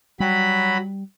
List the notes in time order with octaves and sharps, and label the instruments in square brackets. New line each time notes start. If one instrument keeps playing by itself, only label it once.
[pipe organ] F#3 B5 [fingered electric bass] G3